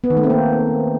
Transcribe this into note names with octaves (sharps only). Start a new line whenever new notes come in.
B3
D#3
A3
C4
A#3